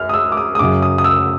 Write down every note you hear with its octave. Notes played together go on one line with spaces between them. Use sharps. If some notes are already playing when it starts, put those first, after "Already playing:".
Already playing: F#2 F6
D#6
E6
D6
D#6
D#6
F#2 C#3 F#3 D6
D#6
D#6
E6